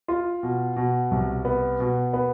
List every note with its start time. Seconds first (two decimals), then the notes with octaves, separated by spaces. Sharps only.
0.08 F4
0.43 B2
0.76 B2
1.11 C2
1.45 B3
1.80 B2
2.13 B3